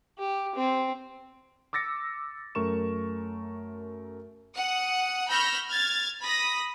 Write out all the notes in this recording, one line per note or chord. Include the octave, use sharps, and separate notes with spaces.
G4
C4
D6 E6 A6 A#6 C#7
F#2 A3 A#4 C#6 E7
F#5 D#6
B5 C#6 E6 F6 G6 A#6
F6 G#6 A6
B5 D#6 A#6